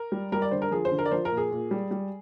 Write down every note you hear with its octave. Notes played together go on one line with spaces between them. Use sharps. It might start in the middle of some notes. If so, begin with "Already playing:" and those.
Already playing: A#4
G3
G3 A#4
D5
D3 C5
A#4
F3 G#4
C5
D3
A#4
D5
F3 C5
A#4
A#2
G#4
A#2
G3
G3